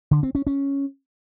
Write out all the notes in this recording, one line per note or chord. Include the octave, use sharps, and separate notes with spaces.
D3
C4
C#4
C#4